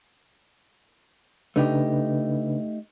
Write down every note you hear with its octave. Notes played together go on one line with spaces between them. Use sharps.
C#3 A3 D4 D#4 G4 B4